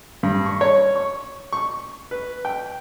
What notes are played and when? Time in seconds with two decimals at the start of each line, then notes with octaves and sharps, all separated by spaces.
0.23 G2
0.46 C#6
0.61 C#5
0.96 C#6
1.53 C#6
2.11 B4
2.45 G5